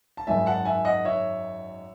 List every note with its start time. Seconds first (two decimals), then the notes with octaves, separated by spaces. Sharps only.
0.17 A5
0.27 G#1 F#2 D#3 G#3 E5 G#5
0.46 F#5 A5
0.65 E5 G#5
0.85 D#5 F#5
1.05 C#5 E5